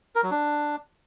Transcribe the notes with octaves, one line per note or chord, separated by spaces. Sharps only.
A#4
F#3
D4